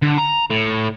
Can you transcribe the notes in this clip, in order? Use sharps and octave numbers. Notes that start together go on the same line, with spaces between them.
D3
A#5
A2